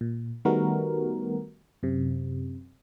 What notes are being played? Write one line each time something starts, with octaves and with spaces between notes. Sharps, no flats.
A#2
D#3 G3 A3 B3 F#4 A#4
F#2 C3